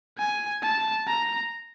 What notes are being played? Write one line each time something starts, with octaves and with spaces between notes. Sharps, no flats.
G#5
A5
A#5